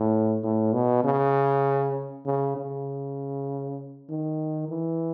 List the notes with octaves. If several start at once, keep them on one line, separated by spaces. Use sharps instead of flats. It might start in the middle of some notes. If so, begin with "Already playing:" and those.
Already playing: A2
A2
B2
C#3
C#3
C#3
D#3
E3